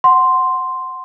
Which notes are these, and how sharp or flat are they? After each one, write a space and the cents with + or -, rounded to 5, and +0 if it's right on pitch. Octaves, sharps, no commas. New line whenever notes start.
F#5 +0 C6 +0